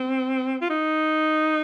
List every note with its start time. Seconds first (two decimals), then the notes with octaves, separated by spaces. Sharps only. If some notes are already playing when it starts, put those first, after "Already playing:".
Already playing: C4
0.62 F4
0.70 D#4